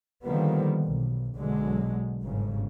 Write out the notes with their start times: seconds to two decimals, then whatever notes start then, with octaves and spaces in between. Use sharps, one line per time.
0.24 D3 D#3 F3 G3 A#3 B3
0.83 B1
1.36 B1 B2 D3 F#3 G#3
2.22 G1 G#2 C#3